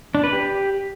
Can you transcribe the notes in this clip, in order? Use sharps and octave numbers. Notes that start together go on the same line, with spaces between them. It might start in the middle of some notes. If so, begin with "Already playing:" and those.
D4
B4
G4